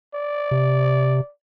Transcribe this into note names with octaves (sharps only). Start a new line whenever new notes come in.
D5
C3